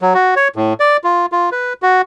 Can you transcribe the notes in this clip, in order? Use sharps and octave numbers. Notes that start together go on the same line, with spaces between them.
F#3
F#4
C#5
A2
D5
F4
F4
B4
F#4